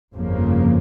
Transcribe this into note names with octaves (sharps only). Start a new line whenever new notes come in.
G1 F2 C#3 F3 A#3